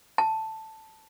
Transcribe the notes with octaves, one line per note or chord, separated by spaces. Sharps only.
A5